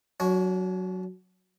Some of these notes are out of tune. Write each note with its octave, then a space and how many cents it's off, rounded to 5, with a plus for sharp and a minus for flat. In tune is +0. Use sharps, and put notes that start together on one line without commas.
F#3 +0 D4 -40 C#5 +0